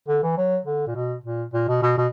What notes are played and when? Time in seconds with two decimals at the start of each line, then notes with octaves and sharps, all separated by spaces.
0.08 D3
0.23 E3
0.37 F#3
0.65 D3
0.87 A#2
0.95 B2
1.24 A#2
1.53 A#2
1.68 B2
1.82 B2
1.97 B2